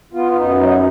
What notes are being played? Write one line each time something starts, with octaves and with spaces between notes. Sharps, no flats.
B3 F4
F4
F#2 D#4
F#3 D#4